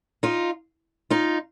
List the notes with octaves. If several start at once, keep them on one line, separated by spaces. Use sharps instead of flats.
D#4 F4
D#4 F4